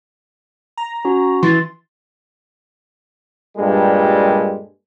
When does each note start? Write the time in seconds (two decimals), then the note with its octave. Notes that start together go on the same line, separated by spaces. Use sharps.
0.77 A#5
1.05 C#4 F#4
1.43 E3 C6 A6
3.58 G2 A#2 G3 G#3 A4